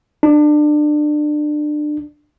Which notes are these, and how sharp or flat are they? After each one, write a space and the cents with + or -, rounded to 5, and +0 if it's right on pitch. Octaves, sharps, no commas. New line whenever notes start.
D4 +25